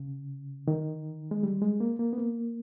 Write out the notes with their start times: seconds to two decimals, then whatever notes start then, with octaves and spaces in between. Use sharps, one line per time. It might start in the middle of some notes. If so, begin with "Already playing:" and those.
Already playing: C#3
0.68 D#3
1.31 G#3
1.43 G3
1.62 G#3
1.80 A#3
1.99 A#3
2.13 B3
2.18 A#3